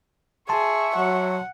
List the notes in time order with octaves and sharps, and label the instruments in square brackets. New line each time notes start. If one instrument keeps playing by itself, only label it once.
[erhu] G#4 [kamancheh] E5 C#6 [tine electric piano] A5 C6
[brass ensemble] F#3 [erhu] F#5